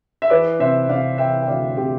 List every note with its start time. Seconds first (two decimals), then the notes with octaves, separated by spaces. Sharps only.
0.22 E5
0.30 E3 B4 D5
0.59 C3 C5 E5
0.89 C3 D5 F5
1.18 E3 E5 G5
1.42 G5
1.47 D2 D5 F5
1.77 C3 G4